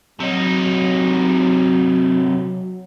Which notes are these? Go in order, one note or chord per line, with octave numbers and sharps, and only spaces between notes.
C3 F#3 D#4